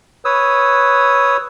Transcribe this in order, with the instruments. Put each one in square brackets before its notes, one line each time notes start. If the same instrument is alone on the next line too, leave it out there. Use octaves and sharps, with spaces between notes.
[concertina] B4 C#5 D#6 E6